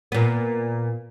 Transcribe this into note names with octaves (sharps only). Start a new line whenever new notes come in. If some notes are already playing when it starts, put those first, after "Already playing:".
A#2 B3